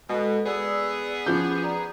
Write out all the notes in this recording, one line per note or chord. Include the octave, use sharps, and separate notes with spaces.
B2 G#3 A4
B3 G#4 D5 E6
F3 C#4 D6 G6
D5 A#5